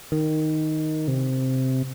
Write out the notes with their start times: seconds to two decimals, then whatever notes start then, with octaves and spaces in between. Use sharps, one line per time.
0.12 D#3
1.08 C3